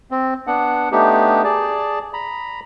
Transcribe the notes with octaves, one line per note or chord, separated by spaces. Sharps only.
C4
B3 D4 F#5
A3 B3 D4 D#4 G4
G#4 D5 A5
A#5 B5